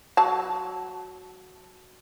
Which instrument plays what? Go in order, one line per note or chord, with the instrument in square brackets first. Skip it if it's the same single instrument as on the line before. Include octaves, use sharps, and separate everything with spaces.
[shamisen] F#3 A5